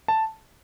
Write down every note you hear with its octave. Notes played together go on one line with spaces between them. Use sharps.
A5